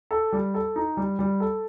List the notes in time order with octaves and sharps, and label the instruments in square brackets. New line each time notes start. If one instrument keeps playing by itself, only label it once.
[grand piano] A4
G3
A4
D#4
G3
G3
A4